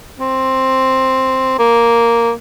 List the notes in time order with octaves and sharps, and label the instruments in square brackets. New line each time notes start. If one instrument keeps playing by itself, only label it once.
[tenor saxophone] C4
A#3